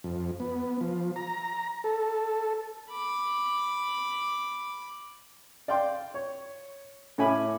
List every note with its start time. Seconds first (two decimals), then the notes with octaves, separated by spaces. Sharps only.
0.04 F2
0.40 B3
0.81 F3
1.16 A#5
1.84 A4
2.89 B5 D6
5.68 D5 F5 G5 C6
6.14 C#5
7.18 A2 A3 C#4 G#5 B5 D6